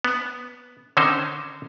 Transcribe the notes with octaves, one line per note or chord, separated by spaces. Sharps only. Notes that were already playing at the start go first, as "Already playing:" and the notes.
B3
D3 D#3 C4 C#4 D#4 C5